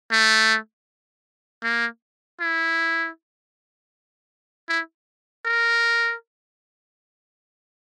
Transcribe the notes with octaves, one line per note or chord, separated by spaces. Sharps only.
A3
A#3
E4
E4
A#4